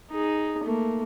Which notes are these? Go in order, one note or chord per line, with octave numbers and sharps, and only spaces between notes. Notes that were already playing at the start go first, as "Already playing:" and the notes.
D#4 G#4
A3 A#3